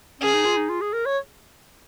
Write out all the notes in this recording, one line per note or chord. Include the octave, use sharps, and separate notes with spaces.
C#4 G#4
D#4
F4
D#4
F4
G#4
A#4
C#5